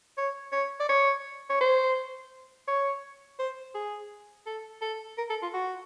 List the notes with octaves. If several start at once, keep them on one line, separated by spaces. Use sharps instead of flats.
C#5
C#5
D5
C#5
C#5
C5
C#5
C5
G#4
A4
A4
A#4
A4
F4
F#4